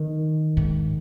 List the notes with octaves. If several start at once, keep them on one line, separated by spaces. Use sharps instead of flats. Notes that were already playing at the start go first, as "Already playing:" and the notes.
Already playing: D#3
G#2